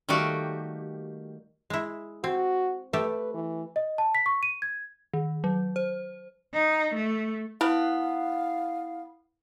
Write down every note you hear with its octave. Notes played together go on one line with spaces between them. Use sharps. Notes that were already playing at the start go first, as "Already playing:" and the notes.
D#3 G3 A3 A#3 F#4 G4
G#3 E4
C4 F#4
A3 G4 A4 B4
E3
D#5
A5
B6
C#6
D#7
G#6
D#3
F#3
C5
D#4
A3
B3 E4 F5